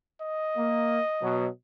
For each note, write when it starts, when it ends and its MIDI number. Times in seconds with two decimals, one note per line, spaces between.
0.22 1.49 75
0.57 0.99 58
1.22 1.48 47
1.22 1.48 54